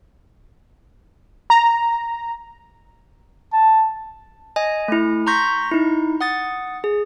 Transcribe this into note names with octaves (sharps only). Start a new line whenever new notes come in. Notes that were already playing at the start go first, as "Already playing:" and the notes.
A#5
A5
D#5 G#5
A3 E4
A#5 C6 C#6 G6 A#6 B6
D#4 E4
F#5 D#6 A6
G#4